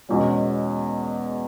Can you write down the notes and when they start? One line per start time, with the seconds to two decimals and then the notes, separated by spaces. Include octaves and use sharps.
0.09 E2 B2 G#3 C#4